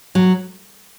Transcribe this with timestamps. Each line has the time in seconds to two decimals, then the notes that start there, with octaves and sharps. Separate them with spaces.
0.15 F#3